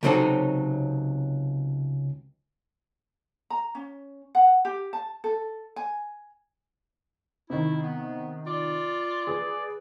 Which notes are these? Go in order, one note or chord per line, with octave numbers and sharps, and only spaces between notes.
C#2 C3 F#3 C4 D#4 A4
A#5
C#4
F#5
G4
A5
A4
G#5
C3 D#3 E4
B3
F4 D5
G#4 B4